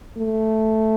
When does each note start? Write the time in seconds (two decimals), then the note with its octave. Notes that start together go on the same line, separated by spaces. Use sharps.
0.18 A3